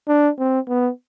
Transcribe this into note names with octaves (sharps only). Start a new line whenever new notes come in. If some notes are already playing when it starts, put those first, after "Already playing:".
D4
C4
B3